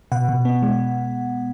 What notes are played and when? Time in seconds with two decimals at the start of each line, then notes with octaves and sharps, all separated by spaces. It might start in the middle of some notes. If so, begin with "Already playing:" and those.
0.12 B2 F#5
0.29 B2
0.45 B3
0.62 G#3